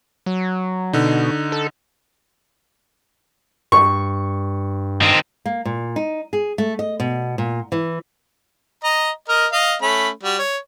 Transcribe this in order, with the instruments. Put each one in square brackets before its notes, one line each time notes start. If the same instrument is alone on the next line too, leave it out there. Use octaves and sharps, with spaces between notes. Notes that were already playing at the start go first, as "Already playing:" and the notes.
[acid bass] F#3
[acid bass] B2 [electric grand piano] D3 D#4
[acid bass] A4
[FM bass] G2 [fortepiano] C#6
[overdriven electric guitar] D#3 C4
[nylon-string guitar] A#3
A#2
D#4
G#4
A3
D#5
B2
A#2
E3
[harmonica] D#5 A#5
A#4 D#5
D#5 F5
A3 C#4 B5
G3 F#4
C#5